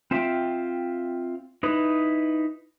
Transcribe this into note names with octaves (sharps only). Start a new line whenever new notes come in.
C4 F4 E5 F5 G5
D#4 E4 B4